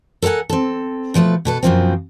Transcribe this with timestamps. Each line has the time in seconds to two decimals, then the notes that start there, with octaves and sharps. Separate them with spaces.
0.22 A4 A#4 D#5 F#5 G#5
0.49 C4 A4
1.14 B2 F3 A3 B4
1.45 B2 A4 B4
1.63 F#2 B2 D#3 F3 A#3 C4